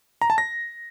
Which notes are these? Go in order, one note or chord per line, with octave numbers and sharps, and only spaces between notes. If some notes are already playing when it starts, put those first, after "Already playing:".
A#5
A5
A#6